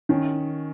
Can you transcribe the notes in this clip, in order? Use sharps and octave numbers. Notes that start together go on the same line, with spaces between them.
D#3 C#4